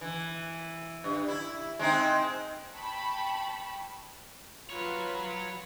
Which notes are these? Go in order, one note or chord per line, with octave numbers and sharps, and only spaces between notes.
E3
G2
E4
G#3 C4 D#4
G5 A5 B5 C#6
F#3 F4 B4 C#5